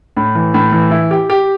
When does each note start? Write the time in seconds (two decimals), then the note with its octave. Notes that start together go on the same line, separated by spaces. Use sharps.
0.17 A2
0.35 E3
0.54 A2
0.72 E3
0.91 E4
1.11 G4
1.30 G4